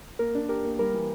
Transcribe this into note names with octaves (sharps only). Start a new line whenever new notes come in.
A#3 A#4
D4
G4 A#4
A#3
G3 A#4
E3